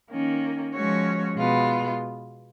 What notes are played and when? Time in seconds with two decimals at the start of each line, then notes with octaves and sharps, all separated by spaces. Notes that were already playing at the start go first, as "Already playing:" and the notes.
0.11 D#3 A#3 C#4
0.74 F3 G#3 C#4 F#4 C#5
1.36 B2 G#3 B3 F4